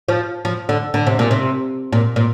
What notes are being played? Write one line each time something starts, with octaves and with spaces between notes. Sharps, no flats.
F3
F3
D3
D3
C3
A#2
C3
A#2
A#2